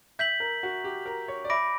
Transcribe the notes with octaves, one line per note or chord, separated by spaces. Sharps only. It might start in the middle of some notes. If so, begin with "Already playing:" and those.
E5 G6 B6 F#7
A#4
F#4
G4
A#4
C#5
D5
E5 B5 D6 A#6 D7